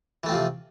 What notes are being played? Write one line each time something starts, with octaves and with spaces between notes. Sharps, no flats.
C3 E3 F3 A3 C4